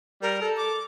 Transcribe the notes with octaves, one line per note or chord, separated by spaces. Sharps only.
G3 A#4
A4
D6